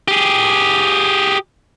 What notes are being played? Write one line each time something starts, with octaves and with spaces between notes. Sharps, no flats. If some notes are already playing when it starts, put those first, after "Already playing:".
G4 G#4